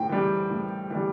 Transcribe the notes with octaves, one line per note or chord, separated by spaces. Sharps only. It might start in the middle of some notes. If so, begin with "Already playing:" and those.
Already playing: A2 G5
E3 G3
A2
E3 G3